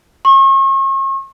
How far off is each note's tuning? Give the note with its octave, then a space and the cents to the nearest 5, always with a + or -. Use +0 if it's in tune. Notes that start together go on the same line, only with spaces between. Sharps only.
C#6 -40